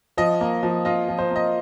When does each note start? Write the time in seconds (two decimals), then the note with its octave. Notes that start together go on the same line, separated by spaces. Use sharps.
0.17 F3 D#5
0.41 A#3
0.63 F3
0.85 F4 D#5
1.08 F3
1.19 C5
1.31 A#3 D#5